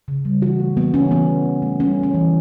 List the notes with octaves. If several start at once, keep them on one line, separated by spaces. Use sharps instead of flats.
C#3
G3
E3 F#4
A3
E3 B3
E3 C#4
E3 B3
E3
E3
A3
G3 C#4
B3
C#4
E3